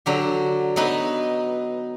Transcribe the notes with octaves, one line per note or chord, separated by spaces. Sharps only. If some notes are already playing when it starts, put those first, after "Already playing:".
D3 F#3 G4
F#3 B3 D#4 B4